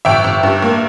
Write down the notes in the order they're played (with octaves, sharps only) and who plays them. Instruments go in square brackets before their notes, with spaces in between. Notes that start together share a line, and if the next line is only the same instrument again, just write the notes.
[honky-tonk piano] G1 E5 G5
G1
G2
A#3